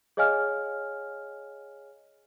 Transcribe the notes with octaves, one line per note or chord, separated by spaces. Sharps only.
G#4 C#5 D#5 F5 G#5 F6